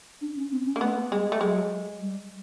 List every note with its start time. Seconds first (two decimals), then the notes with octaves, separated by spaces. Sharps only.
0.21 D4
0.37 C#4
0.52 C4
0.66 C#4
0.76 A#3
0.81 A3 B3
1.11 G3 G#3
1.32 A3
1.41 F#3 G#3
2.01 G3